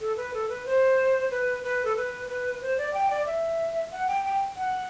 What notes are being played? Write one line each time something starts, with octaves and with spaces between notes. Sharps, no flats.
A4
B4
A4
B4
C5
B4
B4
A4
B4
B4
C5
D5
G5
D5
E5
F#5
G5
G5
F#5